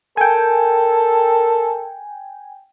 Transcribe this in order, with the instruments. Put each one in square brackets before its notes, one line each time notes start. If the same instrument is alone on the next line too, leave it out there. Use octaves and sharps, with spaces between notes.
[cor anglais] A4 [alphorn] A#4 [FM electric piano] G5 G#5